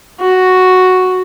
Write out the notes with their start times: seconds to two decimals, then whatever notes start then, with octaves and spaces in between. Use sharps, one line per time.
0.20 F#4